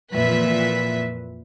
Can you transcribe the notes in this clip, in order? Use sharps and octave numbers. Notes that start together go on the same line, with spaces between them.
F2 A#2 E3 B4 E5 B6